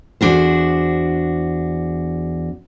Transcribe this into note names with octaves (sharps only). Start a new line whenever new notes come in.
E2 D4 F#4 C5